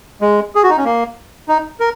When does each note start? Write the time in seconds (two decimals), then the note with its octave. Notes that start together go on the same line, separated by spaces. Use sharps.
0.21 G#3
0.55 G#4
0.63 F#4
0.70 D#4
0.77 C#4
0.85 A#3
1.48 D#4
1.80 A#4